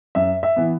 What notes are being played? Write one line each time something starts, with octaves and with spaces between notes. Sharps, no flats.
F#2 E5
E5
E3 B3